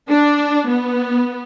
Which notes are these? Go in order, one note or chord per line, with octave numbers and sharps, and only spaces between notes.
D4
B3